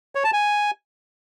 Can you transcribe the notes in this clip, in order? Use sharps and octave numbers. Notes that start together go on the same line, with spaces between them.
C#5
A5
G#5